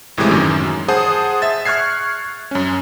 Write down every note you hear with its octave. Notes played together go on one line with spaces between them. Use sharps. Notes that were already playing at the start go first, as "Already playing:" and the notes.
G#1 A2 C3 E3 G#3 D6
F#2 D#3
G#4 C5 F#5 A5 D#6
E5 A6
C#6 F6 F#6 G#6 C7
F#2 C#4